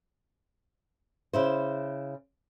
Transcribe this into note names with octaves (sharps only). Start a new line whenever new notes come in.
C#3 E4 C5